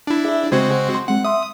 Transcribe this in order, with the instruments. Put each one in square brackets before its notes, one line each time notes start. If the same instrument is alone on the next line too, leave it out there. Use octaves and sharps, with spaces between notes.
[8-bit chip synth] D4 E4
[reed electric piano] G#4 E5
[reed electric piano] C#3 C5 G#6 [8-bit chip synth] G#3 C4 F#4
[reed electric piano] C6
[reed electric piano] G#3 C4 [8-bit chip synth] F#5
[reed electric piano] E5 C6 [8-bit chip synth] D#6